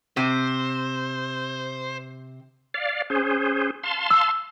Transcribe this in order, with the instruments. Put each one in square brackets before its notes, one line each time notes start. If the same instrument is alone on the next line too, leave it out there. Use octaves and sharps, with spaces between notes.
[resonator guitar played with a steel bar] C3 [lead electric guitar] C5
[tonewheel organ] D5 F5
C#4 G#4 C5
F5 A5 C6
[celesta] E6